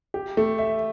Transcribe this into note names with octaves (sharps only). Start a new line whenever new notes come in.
G4
A3
E5